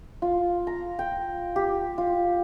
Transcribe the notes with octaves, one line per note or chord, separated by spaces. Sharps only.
F4
A#5
G5
G4
F4